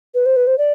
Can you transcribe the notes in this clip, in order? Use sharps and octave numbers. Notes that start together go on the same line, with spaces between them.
B4
C5
B4
C5
D5